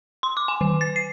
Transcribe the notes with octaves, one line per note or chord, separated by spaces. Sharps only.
C6
D6
G#5
D#3
A6
C7